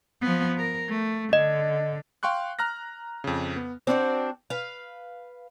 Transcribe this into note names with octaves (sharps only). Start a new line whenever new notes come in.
F3 B3
A#4
A3
D3 D#5
F5 G5 C6 C#6 F#6
A#5 F6 F#6 A#6
F2 C#3
B3
C4 D4 F4 F#4
B4 F5